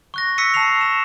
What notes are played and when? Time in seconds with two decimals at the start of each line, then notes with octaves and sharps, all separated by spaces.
0.14 C#6 F#6 A#6
0.38 E6 B6 C#7 D#7
0.54 A5 C#6 A#6 C7 F7
0.81 E7